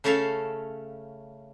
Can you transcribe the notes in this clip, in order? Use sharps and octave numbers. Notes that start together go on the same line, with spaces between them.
C#3 A3 C#4 A4 E5 F5